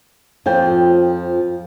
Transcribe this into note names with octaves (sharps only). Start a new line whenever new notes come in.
F2 F3 G5